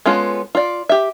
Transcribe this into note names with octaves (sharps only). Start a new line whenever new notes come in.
G#3 B3 C#4 F4 A4
F4 D5
G4 E5